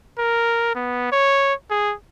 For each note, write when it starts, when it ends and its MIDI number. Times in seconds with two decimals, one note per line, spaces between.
0.18 0.72 70
0.75 1.07 59
1.12 1.54 73
1.70 1.94 68